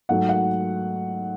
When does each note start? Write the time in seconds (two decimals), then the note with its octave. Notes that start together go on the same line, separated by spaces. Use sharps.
0.09 G#2 F#3 A3 F#5
0.29 F#5